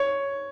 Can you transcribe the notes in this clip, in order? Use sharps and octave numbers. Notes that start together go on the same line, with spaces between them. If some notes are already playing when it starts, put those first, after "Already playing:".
Already playing: C#5